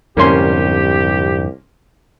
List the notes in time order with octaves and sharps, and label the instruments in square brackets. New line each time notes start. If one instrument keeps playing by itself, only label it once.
[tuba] C2 [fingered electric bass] F2 G#2 D3 [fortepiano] A#3 C#4 C6 [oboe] G4